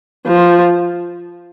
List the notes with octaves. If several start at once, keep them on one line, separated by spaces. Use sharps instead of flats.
F3